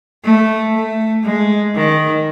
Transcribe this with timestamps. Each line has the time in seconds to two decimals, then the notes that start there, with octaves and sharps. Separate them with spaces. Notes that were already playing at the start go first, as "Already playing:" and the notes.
0.24 A3
0.74 A3
1.24 G#3
1.75 D#3